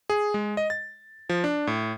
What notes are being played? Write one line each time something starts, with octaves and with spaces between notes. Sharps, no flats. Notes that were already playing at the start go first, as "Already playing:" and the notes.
G#4
G#3
D#5
A6
F3
D4
A2